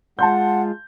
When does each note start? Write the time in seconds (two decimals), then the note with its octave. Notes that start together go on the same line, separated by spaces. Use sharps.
0.19 G#3 F4 F#5 A5 C6 G6